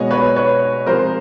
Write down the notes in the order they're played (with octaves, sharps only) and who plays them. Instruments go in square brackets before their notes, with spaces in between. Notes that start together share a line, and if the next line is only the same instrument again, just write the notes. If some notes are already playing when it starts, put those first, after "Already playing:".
Already playing: [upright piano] B2 G#3 B3 C#5 D#5
B4 C#5
B4 C#5
C3 F3 G#3 A#4 C5